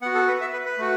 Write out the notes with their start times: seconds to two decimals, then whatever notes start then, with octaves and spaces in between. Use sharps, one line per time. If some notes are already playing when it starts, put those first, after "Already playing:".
0.02 B3 F#5
0.06 F#4
0.15 A4
0.27 B4
0.41 E5
0.53 B4
0.66 B4
0.78 A3 F#4